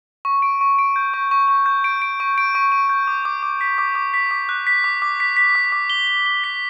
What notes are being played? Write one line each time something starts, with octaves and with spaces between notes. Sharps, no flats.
C#6
D7
C#6
D7
G6
C#6
C#6
C#6
G6
D7
D7
C#6
D7
C#6
C#6
G6
D6
D6
D6
B6
D6
D6
B6
D6
F#6
B6
D6
D6
B6
B6
D6
D6
G7
G7
G7
B6